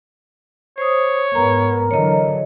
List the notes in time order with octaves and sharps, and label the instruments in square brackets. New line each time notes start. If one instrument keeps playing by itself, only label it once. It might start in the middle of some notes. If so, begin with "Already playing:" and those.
[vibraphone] C5 D#6 [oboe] C#5
[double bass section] G#2 B3 [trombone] A#4 [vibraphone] A#5
[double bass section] D3 E3 F#3 [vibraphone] C#5 D#5